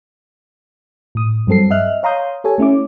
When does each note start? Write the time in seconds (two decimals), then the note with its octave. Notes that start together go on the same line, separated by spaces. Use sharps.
1.15 A2 D#6
1.47 G2 F#3 C4 A4 C7
1.70 D#5 E5 F6 F#6
2.03 C#5 F5 A#5 C6 D#6 G6
2.44 G4 A4 C#5 G#5
2.58 A3 C#4 E4 D6